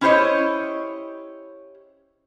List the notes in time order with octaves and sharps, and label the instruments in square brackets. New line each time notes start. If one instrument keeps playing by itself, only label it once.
[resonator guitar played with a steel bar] C#4 E4 G4 C5 C#5 D#5